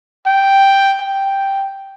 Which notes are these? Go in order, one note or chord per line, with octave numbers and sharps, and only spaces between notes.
G5
G5